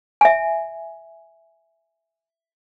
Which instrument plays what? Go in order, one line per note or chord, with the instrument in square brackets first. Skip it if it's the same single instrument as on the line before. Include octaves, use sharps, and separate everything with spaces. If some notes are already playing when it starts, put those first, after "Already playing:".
[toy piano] E5 G#5